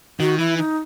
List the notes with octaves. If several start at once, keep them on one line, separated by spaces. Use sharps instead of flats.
D#3 F#4
E3 E4
D#4